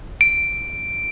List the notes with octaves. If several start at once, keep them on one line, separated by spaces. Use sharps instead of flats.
D7